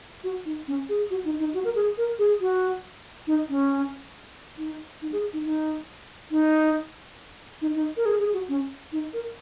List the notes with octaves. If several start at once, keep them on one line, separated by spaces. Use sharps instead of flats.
F#4
D#4
C#4
G#4
F#4
D#4
D#4
F#4
A#4
G#4
A#4
G#4
F#4
D#4
C#4
D#4
D#4
G#4
D#4
D#4
D#4
D#4
D#4
A#4
G#4
G#4
F#4
C#4
D#4
A#4